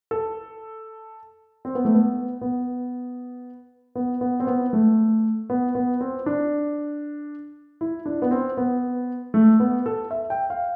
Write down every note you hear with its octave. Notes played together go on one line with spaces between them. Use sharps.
A4
C4
B3
A3
B3
B3
B3
B3
C4
B3
A3
B3
B3
C4
D4
E4
D4
B3
C4
B3
A3
B3
A4
E5
G5
F5